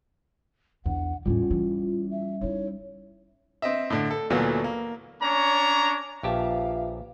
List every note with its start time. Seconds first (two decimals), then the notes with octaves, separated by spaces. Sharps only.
0.86 B1 E2 D4 F#5
1.26 E2 A2 G3 A#3 C#4 F4
1.51 E3
2.11 E5
2.41 D#4 E4 C#5
3.62 C4 D#5 E5
3.90 A2 D3
4.11 A4
4.30 D2 A#2 E3 F#3 A3 B3
4.64 A#3
5.22 C#4 D4 C#5 A#5
6.23 A#1 F4 G4 B4 E5 F5 A5